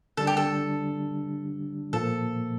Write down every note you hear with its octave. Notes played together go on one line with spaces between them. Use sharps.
D3 G3 D4 A4
G4
A4
A#2 F3 A#3 A4